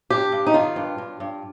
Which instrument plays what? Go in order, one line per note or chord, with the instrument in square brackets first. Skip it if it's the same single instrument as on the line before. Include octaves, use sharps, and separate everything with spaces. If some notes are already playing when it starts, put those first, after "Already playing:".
[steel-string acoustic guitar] G2 G4
G2
D#4
D#3 F4
G2
G2
G2